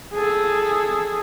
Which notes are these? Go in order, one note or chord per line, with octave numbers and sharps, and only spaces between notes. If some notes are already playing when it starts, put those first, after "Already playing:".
G#4 A4